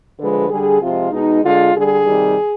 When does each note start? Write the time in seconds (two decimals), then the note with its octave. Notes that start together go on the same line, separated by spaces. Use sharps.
0.20 D3 F3 G#3 B4
0.50 D3 G3 G#4
0.81 C3 F3 G#3 F4
1.12 B2 G#3 D#4
1.43 D3 G#3 F4
1.74 D3 G3 G#4
2.05 C3 D#3 G3